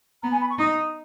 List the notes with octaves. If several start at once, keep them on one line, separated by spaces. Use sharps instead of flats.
B3 A#5
G#5
B5
C#6
D#4 D#6